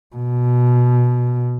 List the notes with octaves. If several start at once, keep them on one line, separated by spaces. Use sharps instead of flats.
B2